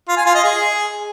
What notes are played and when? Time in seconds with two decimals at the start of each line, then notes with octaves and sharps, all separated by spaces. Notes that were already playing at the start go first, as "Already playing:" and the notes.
0.08 F4
0.17 G#5
0.26 F4
0.35 D#5
0.44 G#4